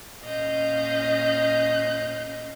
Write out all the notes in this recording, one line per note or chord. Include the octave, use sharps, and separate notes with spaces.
A#2 C#4 D#5 F5 G6